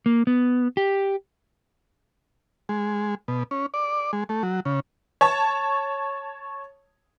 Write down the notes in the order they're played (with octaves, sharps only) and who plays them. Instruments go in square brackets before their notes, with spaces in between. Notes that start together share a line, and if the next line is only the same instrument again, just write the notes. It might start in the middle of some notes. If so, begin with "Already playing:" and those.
[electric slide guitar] A#3
B3
G4
[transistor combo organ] G#3
B2
C#4
D5
G#3
A3
F#3
C#3
[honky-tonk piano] C#5 A5 C#6